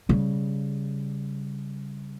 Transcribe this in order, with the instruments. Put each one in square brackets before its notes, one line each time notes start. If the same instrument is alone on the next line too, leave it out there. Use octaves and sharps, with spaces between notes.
[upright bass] C#3 G3